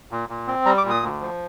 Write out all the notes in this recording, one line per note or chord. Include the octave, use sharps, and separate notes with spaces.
A#2
A#2
C4
G3 A#5
D6
A#2
D#6
D2
F3